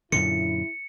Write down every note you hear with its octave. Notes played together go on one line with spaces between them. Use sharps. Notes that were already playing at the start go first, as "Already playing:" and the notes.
F#2 A#2 D3 E4 C#7